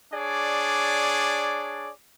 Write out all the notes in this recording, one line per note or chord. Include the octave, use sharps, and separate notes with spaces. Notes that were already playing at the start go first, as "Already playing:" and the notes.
D4 G#4 C#5 D5